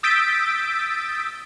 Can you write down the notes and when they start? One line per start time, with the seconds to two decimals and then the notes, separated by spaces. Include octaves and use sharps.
0.03 D#6 E6 G6 A6 B6 D7